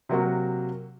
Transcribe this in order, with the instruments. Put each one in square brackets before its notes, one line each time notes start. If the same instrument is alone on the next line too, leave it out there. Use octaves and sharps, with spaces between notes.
[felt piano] C3 F#3 A#3 F#4